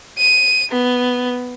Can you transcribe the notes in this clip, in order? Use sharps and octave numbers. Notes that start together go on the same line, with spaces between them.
D#7
B3